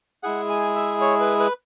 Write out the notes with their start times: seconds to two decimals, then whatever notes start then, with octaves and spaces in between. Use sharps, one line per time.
0.23 G#3 E4 G#4 F#5
0.50 G#5
0.76 E5
1.01 C#5
1.20 B4
1.40 B4